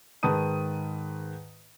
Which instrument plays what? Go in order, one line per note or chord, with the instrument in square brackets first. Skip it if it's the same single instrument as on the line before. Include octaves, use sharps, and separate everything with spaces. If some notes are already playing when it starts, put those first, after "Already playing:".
[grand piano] G#2 D#3 B4 A5 D#6 D#7